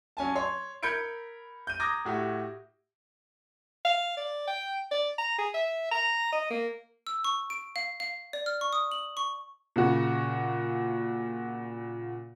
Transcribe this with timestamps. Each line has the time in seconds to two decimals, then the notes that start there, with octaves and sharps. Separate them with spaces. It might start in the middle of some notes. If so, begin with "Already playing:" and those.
0.17 F#3 C#4 G#5 A5
0.35 C#5 C6
0.83 A#4 B5 G6 G#6 C#7 D7
1.67 G6 D#7
1.80 A#5 D6 D#6 G6 G#6 A#6
2.05 A2 F#4 G4
3.85 F5
4.17 D5
4.47 G5
4.91 D5
5.18 A#5
5.38 G#4
5.54 E5
5.91 A#5
6.32 D#5
6.50 A#3
7.07 E6
7.24 C#6
7.50 D7
7.76 F5
8.00 F5
8.33 D5
8.46 F6
8.61 C#6
8.73 D#6
8.92 F#7
9.17 C#6
9.76 A#2 C#3 F#4